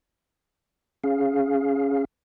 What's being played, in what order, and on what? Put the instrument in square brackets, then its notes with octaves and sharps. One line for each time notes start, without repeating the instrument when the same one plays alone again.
[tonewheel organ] C#4 G#4 F5